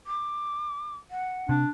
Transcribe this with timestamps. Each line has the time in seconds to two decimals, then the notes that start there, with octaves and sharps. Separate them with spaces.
0.07 D6
1.11 F#5
1.49 C3 D4